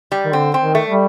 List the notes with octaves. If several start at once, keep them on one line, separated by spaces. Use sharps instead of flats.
G3
D#3
D3 C4
C4
D#3
A3
G3